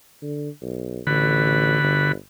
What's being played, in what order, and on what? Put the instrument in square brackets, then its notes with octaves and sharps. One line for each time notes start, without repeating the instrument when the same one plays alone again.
[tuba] D3
B1
[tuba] A1 [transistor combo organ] D3 F#4 B5
[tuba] G1